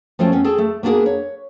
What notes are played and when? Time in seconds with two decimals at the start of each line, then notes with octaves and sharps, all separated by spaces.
0.19 F3 A3 C#4 F4 G5 A5
0.32 B3 C#4
0.44 G#4 A4 G5 A5
0.58 A3
0.83 A#3 B3 D4 F4 G#4 A#4
1.06 C#5